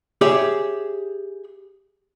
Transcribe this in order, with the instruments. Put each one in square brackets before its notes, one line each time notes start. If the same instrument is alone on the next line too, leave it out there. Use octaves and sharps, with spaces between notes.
[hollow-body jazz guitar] G4 G#4 C#5 E5